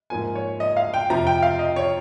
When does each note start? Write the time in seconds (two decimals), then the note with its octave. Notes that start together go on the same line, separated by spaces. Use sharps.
0.10 G#2 F3 A#3 G#5
0.35 C#5
0.60 D#5
0.77 F5
0.94 G5
1.10 F2 C3 F3 A#5
1.27 G5
1.43 F5
1.59 D#5
1.76 C#5